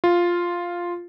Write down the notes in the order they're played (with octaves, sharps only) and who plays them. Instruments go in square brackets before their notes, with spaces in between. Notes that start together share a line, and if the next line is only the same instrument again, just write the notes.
[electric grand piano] F4